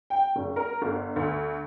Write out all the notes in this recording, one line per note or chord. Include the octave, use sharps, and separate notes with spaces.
G5
F#1
A#4
G1
D2